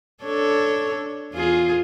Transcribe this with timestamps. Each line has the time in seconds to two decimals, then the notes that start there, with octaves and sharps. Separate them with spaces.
0.23 D4 A4 C#5
1.33 E2 F4 G#4